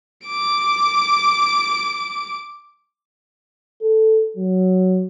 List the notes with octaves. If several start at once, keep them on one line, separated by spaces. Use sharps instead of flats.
D6 D7
A4
F#3